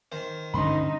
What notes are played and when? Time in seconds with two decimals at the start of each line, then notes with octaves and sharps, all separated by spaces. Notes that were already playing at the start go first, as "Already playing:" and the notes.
0.12 D#3 C5
0.54 G2 D3 C#4 D#4 B5 C6